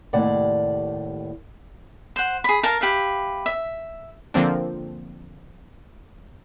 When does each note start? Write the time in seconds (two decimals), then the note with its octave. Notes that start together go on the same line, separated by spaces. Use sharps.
0.13 D#2 A2 C3 D5 F#5
2.16 C5 F#5
2.44 G#4 B5
2.63 A#4 F5 A5
2.81 G4 B4 E5 F5
3.46 E5
4.34 D3 F3 A#3 C4 D4